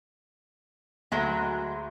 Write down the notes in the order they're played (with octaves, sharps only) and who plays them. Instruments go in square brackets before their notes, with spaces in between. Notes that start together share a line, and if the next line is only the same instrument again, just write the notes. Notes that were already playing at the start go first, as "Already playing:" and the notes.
[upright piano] D2 [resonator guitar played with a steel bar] F#3 G#3